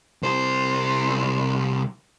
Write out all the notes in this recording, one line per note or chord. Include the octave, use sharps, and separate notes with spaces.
C2 C5